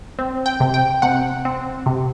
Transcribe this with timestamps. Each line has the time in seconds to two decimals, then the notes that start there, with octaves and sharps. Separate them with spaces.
0.19 C4
0.46 G5
0.60 C3
0.74 G5
1.02 C3 F#5
1.45 C4
1.86 C3